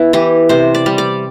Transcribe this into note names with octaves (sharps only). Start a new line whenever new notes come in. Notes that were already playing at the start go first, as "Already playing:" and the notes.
Already playing: B3 E4
E3 G4
C3 C5
D5
G3
D5